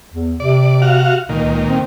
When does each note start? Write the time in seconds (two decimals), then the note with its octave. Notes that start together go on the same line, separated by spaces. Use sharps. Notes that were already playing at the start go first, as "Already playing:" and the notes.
0.12 E2
0.40 C3 D5
0.82 F#4 F5
1.29 C#2 A#2 D#3
1.69 C4